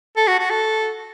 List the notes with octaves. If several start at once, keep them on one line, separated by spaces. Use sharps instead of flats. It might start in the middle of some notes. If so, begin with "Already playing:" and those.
A4
F#4
F#4
A4